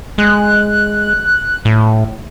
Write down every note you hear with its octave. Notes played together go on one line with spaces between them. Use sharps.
G#3 F#6
A2